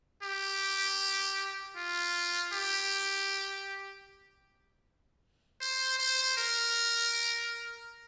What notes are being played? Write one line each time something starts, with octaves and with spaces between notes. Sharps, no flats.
G4
F4
G4
C5
C5
A#4